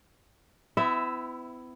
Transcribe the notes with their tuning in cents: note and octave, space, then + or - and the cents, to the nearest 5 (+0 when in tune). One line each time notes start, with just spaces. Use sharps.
B3 +45 E4 +10 E5 +0